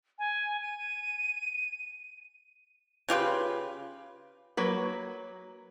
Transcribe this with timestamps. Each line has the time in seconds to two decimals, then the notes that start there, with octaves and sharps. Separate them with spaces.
0.19 G#5
0.62 D#7
3.09 C#3 F4 G4 B4
4.57 F#3 A#3 B4